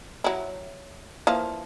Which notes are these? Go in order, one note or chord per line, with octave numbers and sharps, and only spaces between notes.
F#3 E4
E3 F3 A#3